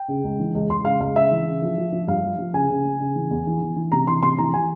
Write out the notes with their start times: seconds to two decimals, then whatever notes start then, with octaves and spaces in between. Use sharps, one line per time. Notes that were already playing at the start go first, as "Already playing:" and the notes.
Already playing: G5
0.08 C#3
0.24 C#2
0.39 E3
0.54 C#2
0.70 C#2 C6
0.85 C#3 F5
1.01 C#2 F5
1.16 C#3 E5
1.31 E3
1.47 C#3
1.62 F3
1.78 F3
1.92 F3
2.07 G2 F5
2.24 F3
2.38 F3
2.54 C#3 G#5
2.70 C#3
2.85 C#3
3.00 C#3
3.16 E3
3.31 E2
3.47 E3
3.62 E3
3.76 E3
3.92 C3 A#5
4.07 E3 C6
4.22 C3 C6
4.38 E3 A#5
4.54 E3 G#5